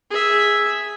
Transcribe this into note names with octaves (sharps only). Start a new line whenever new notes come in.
G#4 E5